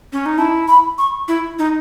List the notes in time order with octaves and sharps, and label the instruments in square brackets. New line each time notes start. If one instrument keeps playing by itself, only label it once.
[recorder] C#4
D#4
[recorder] E4 [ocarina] A5
[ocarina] B5
C#6
[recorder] E4
D#4